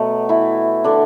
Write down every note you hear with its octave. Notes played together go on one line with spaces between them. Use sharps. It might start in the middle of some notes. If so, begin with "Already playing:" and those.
Already playing: B2 F#3 A3 B3
E3 E4
D3 D4